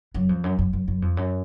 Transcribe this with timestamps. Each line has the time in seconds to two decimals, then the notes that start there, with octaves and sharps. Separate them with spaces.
0.14 F#2
0.29 F2
0.44 F#2
0.59 F#2
0.73 F#2
0.88 F#2
1.02 F2
1.17 F#2